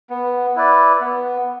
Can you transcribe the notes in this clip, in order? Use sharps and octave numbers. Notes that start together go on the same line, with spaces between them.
B3
E4 B4 D5
B3